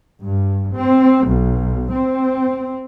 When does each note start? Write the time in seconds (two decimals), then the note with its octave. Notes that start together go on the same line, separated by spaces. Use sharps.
0.22 G2
0.73 C4
1.26 B1
1.90 C4